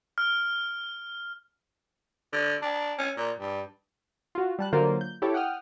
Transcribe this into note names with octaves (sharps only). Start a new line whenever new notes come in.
F6
D3
D4
C#4
A#2
G2
F4 F#4
G3 A5 F#6
D3 F#3 A#3 F4 A#4 C5
G6
E4 G4 A4 C#5 D6
F#5 G5 D#6 F6